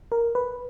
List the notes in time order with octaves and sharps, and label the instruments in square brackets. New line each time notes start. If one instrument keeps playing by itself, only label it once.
[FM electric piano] A#4
B4